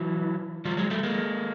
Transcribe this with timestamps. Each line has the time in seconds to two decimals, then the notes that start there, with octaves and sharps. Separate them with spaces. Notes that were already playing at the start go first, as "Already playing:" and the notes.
Already playing: E3 F#3
0.65 F3 G3
0.77 F#3 G#3
0.90 G3 A3
1.03 G#3 A#3